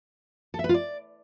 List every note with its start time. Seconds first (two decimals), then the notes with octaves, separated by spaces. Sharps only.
0.54 A4
0.59 E5
0.64 B4
0.69 F4
0.74 D5